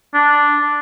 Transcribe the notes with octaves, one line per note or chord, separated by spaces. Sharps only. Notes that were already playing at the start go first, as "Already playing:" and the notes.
D4